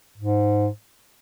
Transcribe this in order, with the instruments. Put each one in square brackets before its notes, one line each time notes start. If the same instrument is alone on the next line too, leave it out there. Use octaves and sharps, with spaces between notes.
[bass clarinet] G#2